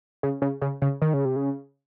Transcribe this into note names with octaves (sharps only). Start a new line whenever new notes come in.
C#3
C#3
C#3
C#3
D#3
C#3
C3
C#3